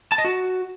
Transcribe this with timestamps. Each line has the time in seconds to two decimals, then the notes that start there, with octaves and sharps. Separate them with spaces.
0.12 A5
0.18 D#5
0.25 F#4